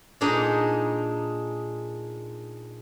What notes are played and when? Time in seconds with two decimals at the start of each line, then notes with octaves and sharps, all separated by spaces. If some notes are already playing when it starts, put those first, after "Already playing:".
0.21 A#2 G#3 D4 D#4